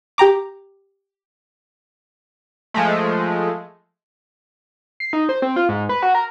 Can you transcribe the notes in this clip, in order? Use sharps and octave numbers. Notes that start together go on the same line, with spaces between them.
G4 G5 A#5 D6
F3 G#3 A3
C7
D#4
C5
C4
F4
G#2
B4
F#4
A#4